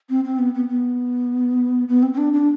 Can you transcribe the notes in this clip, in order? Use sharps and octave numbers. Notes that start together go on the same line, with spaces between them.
C4
C4
B3
B3
B3
B3
C4
C4
D4
D4